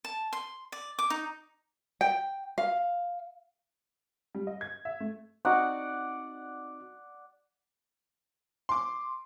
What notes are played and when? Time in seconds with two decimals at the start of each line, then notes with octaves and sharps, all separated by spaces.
0.05 A5
0.33 C6
0.72 D5
0.99 D6
1.10 D#4
2.01 G5
2.58 F5
4.35 G3
4.47 D#5
4.61 G#6
4.85 E5
5.00 A3
5.45 C4 D#4 F#4 D5 F#5
8.69 C6 D6